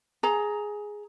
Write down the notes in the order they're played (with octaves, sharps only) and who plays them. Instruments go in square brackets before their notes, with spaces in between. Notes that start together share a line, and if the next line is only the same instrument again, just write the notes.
[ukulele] G#4 A#5